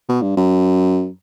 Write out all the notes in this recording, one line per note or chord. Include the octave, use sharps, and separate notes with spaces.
B2
G2
F#2